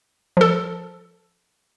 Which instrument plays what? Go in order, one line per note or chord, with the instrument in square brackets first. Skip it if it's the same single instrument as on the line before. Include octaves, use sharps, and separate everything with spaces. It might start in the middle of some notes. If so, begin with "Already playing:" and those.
[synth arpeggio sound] F3 A4